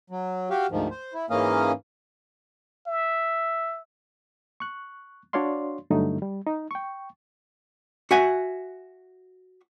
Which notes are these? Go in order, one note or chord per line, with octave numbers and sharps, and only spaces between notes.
F#3
F#4 G4 F5
D2 G#2 D#3 F3
C5
E4
G#2 E3 A#3 C#4 D#5 F5
E5
C#6 F#6
D4 F#4 C#5 D5 F5 C6
G2 D3 F#3 A3 D#4
G3
D#4
G5 C#6
F#4 E5 F#5 G#5